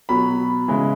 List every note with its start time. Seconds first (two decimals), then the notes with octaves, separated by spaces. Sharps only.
0.09 B2 F#3 B5
0.68 C#3 E3 G#3